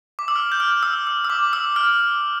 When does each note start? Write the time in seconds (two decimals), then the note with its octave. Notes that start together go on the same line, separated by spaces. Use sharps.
0.19 D6
0.28 E6
0.36 F6
0.52 G6
0.60 F6
0.83 E6
1.07 E6
1.24 E6
1.30 D6
1.53 E6
1.76 F6